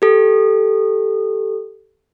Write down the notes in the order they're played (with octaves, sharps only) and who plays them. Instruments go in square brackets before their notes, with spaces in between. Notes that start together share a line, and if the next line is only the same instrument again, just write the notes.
[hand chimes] G4 A4